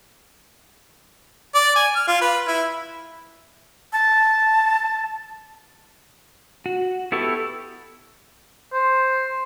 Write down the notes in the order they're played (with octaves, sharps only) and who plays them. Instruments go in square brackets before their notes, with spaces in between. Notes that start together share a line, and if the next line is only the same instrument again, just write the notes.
[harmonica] D5
G#5
F6
F4
B4
E4
[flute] A5
[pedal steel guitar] F#4
B3 E4 G4 A4 C#6
[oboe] C5